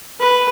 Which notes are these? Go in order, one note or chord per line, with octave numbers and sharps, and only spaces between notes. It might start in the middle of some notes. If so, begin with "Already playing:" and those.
B4